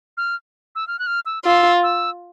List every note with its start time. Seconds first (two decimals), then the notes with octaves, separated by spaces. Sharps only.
0.17 F6
0.75 E6
0.88 F6
0.99 F#6
1.07 F6
1.26 E6
1.45 F4 E6
1.83 E6